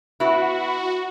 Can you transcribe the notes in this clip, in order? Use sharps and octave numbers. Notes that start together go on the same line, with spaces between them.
B3 E4 F#4